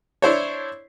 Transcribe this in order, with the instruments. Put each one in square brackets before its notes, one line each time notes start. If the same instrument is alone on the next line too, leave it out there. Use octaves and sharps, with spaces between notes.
[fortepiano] D4 E4 C5 C#5